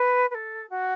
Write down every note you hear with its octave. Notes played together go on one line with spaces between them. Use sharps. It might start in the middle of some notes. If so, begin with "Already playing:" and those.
Already playing: B4
B4
A4
F#4